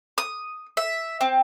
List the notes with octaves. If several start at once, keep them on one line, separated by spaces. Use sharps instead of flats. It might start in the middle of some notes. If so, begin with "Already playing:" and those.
D#6
E5
C4